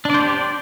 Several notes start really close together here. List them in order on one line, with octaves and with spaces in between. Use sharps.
D4 D5 C5 G4